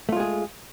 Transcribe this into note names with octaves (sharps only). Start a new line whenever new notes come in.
G#3 A3 F4 G#4